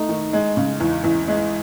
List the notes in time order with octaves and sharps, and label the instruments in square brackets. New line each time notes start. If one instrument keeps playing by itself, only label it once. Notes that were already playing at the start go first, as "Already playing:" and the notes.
Already playing: [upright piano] A3 [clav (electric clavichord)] D#4
[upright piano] D#3
G#3
C#3
E2
E2
G#3